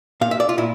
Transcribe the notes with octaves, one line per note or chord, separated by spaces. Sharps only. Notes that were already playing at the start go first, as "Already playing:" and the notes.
A#2 F5
E5
D5
F4
A#2 E4